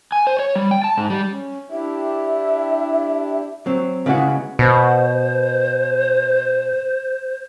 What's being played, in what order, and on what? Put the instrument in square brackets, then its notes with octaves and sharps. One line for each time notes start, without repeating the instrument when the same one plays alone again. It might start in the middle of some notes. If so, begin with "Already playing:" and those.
[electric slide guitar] G#5
C5
C#5
G3
G5
A5
G#2
G3
[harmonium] C#4
[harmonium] D4 E4 G4 [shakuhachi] E5
[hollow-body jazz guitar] F#3 C4
C#3 G#3 B3 E4 F#4
[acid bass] B2 [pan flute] C5